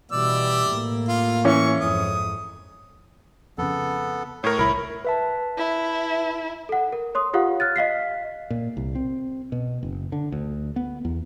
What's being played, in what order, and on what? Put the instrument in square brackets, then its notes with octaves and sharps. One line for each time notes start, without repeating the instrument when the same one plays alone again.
[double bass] B2 E3 [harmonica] G3 D5 E6
[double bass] A2 A#3
[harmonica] F4
[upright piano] E3 C#4 [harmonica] C#6
[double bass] F2 G#2 [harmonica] D#6
[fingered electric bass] F2 C#3 [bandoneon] B3 A4
[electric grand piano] A2 A#4 [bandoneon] C#5
[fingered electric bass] D1 C2 [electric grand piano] E4 A#4 [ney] B5
[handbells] B4 E5 A5
[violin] E4
[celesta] A4 F#5
A#4
C#5 C6 D#6
F4 G4 C#5 F5 F#5
F6 F#6 A6
D#5 F5 B6 C7
[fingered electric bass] A#2
C2
C4
B2
F#1
D3
D2
B3
E2